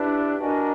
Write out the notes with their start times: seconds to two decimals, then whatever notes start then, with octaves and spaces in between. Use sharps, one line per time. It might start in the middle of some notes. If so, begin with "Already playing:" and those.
Already playing: D4 E4 G4 B4
0.40 D4 F#4 A#4 D#5 G#5